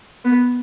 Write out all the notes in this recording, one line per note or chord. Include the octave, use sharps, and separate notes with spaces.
B3